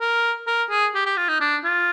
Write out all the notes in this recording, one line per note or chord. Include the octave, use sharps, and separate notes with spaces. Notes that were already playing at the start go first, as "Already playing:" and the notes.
A#4
A#4
G#4
G4
G4
F4
D#4
D4
F4